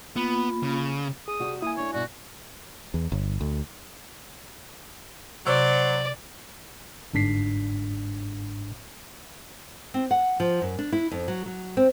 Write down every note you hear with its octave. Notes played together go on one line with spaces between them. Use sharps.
A#3 B3 F4 B5
C#3
G#4 D#6
C3 G3 F#4
A#3 E4 G#5 D#6
A3 B3 D4 C#5
G2 B2 F#4
E2
G1
D2
C3 F#3 C5 D5
G1 G#2 D4 B6 C7
C4
F#5
F3
F#2
D4
E4
F2
F#3
F#3
C4